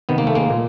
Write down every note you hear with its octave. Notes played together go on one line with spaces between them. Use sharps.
C3 D#3 B3
A#3
A3
G#3 A#3
A#2